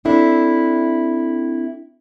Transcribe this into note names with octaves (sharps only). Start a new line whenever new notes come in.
C4 D4 E4 A4